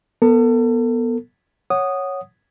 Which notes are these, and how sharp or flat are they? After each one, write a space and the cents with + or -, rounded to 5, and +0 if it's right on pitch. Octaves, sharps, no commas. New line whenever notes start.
B3 -15 A4 +35
C#5 -5 F#5 +0 D#6 -10